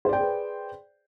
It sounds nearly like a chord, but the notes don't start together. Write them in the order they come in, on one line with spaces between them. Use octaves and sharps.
C5 D5 G5 G#4 B4